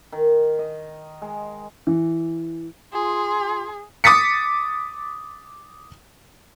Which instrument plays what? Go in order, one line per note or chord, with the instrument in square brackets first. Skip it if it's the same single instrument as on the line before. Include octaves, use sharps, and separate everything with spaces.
[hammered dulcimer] D#3
D#5
G#3
[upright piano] E3
[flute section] F4 G#5 C6 [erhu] G#4
[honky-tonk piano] D6 D#6 A6 B6 C#7